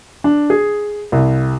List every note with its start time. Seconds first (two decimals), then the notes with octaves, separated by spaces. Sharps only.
0.24 D4
0.50 G#4
1.12 C2